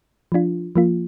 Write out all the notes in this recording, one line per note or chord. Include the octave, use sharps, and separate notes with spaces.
F3 D4 F4
F3 A#3 F4